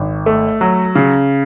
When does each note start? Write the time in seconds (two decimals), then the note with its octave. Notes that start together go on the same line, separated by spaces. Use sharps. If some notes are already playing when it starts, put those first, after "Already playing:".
Already playing: G#1
0.26 A3
0.61 F#3
0.96 C#3